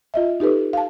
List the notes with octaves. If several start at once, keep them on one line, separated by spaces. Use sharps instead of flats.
F4 D#5 E5
D#4 G4 A4 B4
F5 A5